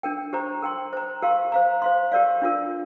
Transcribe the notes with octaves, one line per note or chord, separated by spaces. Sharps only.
D4 A#4 G5
G4 C5 A#5
A#4 G5 C6
C5 A#5
G4 A#4 F5 C6
C5 F5 A#5
C5 F5 C6
G4 A#4 D5 F5
D4 F4 A#4